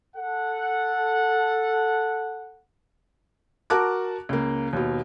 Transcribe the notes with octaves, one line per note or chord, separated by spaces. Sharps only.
A4 F#5
F#4 A#4 A5 D6 F#6
C#2 A#3
D#2 B2